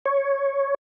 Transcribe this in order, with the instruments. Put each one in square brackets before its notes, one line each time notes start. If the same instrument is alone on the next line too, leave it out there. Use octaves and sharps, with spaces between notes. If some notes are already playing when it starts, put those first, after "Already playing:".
[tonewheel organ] C#5